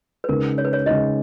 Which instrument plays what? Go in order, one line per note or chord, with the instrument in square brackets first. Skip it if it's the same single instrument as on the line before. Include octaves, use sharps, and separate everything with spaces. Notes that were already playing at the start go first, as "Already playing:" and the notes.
[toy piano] B4
[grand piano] C#3 G#3 D#4 [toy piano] A#4
[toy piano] C#5
B4
C#5
[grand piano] C#3 G#3 D#4 [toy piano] D#5